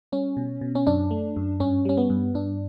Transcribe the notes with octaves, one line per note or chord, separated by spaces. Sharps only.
G3 C#4
B2
B2
C#4
F#2 D4
A3
F#2
G2 C#4
G3 C#4
B3
G2
G2 D4